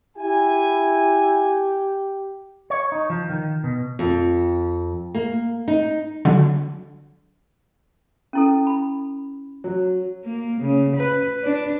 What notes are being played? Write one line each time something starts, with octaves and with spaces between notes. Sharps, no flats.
E4 G4 G#5
C#5
D#4
F3
D#3
B2
F2
A#3
D#4
D3 F#3
C#4 E4 A4
B5
F#3
A#3
C#3
B4
D4